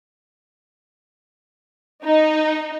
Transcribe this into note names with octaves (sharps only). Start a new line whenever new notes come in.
D#4